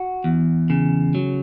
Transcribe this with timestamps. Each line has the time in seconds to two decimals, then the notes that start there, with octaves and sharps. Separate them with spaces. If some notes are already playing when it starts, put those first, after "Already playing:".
Already playing: F#4
0.24 E2
0.70 C#3
1.15 F#3